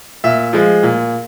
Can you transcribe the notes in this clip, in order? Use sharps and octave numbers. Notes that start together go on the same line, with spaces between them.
A#2 E5
F3 G#3
A#2